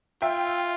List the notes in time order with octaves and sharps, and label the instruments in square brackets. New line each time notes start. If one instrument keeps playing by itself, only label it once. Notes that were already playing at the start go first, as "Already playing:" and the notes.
[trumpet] F4 [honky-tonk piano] E5 G5